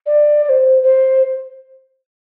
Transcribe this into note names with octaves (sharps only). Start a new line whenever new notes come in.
D5
D5
C5
C5